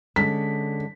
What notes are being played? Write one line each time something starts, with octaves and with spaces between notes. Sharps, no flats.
D3 G#3 C#4 B6